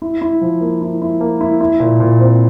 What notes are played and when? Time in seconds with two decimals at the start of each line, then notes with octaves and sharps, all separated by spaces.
0.02 E4
0.21 E4
0.41 F3
0.61 A#3
0.82 E4
1.02 E4
1.21 A#3
1.41 E4
1.61 E4
1.80 A#2
2.00 A#2
2.19 C4